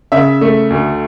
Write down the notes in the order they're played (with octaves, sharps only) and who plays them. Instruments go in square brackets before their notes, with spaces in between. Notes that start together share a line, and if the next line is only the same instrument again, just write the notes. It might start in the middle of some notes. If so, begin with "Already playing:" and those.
[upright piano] C#3 E5
A3
D2